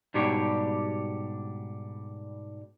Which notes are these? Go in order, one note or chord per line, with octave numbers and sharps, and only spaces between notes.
G#2 B2 G3 D4 G4 C#5